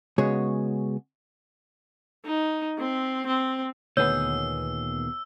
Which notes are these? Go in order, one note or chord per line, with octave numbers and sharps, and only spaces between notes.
C#3 G#3 B3 F#4 G#4 C#5
D#4
C4
C4
D2 A#2 D#3 B3 G#4 C#5 E6